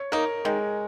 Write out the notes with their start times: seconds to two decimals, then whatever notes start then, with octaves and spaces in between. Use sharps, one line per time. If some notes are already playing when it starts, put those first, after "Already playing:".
Already playing: C#5
0.12 A#3 D#4 A#4
0.45 D#3 G#3